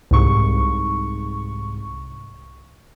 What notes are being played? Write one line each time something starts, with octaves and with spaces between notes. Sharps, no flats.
C2 G#2 C#6